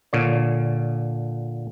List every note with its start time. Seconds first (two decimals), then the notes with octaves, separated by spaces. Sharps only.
0.13 A#2 D3 C#5